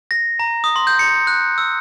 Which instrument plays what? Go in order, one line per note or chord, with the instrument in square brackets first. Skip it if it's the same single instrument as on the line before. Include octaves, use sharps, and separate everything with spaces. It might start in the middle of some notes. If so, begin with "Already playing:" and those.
[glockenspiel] A#6
A#5
D#6
C6
G6
C#7
F#6
E6